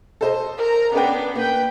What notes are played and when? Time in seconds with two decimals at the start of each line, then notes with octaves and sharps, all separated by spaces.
0.21 A4 C5 D#5
0.58 A#4 A#5
0.93 B3 C#4 D4 B4 G5
1.35 A#3 B4 G5